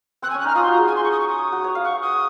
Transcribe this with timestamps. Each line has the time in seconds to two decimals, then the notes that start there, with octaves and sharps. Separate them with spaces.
0.22 C4 F#6
0.30 G#5
0.34 C#4
0.40 F#6
0.44 D#4 F6
0.55 F4 D#6
0.64 C6
0.67 F#4 A#5
0.77 G#4
0.87 G#5
0.96 C6
1.04 C#6
1.12 D#6
1.20 C#6
1.28 D#6
1.52 F#4
1.64 C#5
1.75 F5
1.85 F#5 C#6
2.02 D#6